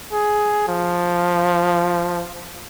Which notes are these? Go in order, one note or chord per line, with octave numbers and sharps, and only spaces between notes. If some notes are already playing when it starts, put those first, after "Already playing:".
G#4
F3